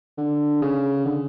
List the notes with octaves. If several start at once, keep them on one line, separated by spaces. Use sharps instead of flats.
D3
C#3
D3